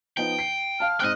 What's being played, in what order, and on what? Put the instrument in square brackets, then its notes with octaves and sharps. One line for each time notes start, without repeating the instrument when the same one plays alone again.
[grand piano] F3 B3 D#4 [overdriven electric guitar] G5
[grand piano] C7
[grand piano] F5 A5 [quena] F6
[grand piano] G#2 C4 F#6 [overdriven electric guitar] D#5 G5